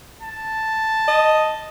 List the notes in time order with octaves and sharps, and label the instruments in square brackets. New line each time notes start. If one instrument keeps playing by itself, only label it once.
[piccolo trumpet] A5
[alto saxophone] D#5